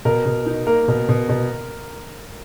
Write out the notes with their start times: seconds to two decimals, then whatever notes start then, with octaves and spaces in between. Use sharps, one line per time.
0.05 B2 A#4
0.26 B2
0.46 D#4
0.67 A#3 A#4
0.88 B2
1.09 B2
1.29 B2